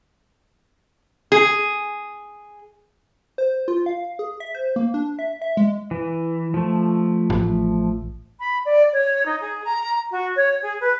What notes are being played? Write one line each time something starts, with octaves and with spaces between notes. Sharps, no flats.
G#4
C5
F4
F5
G#4
E5
C5
A#3
D4
E5
E5
G#3
E3
F3 A3
A1
B5
D5
C#5
D#4
G#4
A#5
F#4
C#5
G#4
B4